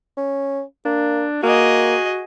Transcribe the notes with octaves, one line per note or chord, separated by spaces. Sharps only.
C#4
A#3 D4
A#3 F#4 G#4 D#5